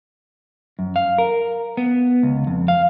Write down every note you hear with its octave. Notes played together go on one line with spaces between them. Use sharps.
F#2
F5
A#4
B3
C#2
F2
F5